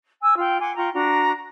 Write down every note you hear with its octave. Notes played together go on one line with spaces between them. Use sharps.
G#5 E6
F4 G5
F#5 G#5 C6 D6
F4 G5 A#5 C#6
D4 F#4 A#5